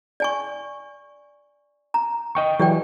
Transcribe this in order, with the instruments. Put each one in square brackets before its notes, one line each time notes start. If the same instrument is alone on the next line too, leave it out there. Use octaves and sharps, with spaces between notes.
[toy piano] D5 G#5 C#6
A#5
[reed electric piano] D#5 G5 C#6
[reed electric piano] E3 F#3 [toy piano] G4 D5 G5